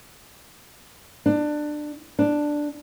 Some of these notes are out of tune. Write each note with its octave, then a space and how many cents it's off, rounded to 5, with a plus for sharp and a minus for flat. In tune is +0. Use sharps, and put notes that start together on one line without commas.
D4 +20
D4 +5